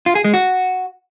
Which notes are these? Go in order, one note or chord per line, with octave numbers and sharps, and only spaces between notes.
F4
G#4
G#3
F#4